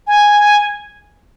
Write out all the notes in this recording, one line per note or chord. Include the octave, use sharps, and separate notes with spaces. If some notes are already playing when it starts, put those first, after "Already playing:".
G#5